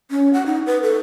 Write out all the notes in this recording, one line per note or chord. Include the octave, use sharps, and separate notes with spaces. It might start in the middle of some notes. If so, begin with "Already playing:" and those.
C#4
F#5
D#4
B4
A4